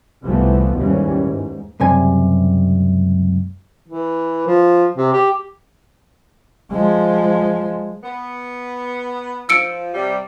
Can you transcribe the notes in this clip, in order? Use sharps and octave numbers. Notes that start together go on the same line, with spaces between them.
C2 E3 F3 A3 B3
D#2 G#2 E3 G3 C#4
G#2
C#2 F#2 C3 G3 G#5
E3
F3
C3
G4
F3 G#3
B3
F3 E6 C#7 D7
C3 G3